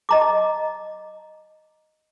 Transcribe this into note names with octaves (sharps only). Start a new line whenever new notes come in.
D#5 A#5 D6